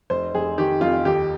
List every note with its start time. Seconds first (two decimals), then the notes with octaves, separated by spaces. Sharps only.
0.10 F1 C5
0.35 F1 G#4
0.58 D#3 G4
0.81 F2 F4
1.05 D#2 G4